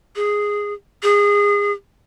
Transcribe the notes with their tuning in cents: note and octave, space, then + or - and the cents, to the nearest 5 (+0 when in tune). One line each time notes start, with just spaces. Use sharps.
G#4 -5
G#4 -25